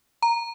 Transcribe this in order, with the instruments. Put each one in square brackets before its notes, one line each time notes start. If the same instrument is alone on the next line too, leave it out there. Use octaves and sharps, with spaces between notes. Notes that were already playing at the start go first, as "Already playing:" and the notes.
[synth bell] A#5